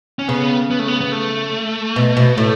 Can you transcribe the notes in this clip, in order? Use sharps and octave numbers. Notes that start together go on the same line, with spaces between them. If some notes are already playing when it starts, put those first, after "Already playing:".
C#4
C#3 B3
B3
A3
B3
B3
A3
B2
B2
A2